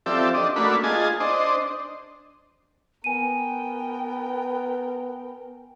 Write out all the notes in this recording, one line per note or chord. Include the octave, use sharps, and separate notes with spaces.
F3 C4 G4 A4 D5 E5
D4 D#5
A3 A#3 D4 F#4 B5
F4 G#4 D#5 G#5 A5
D4 C5 D#5
B3 A#4 G5 G#5 D#7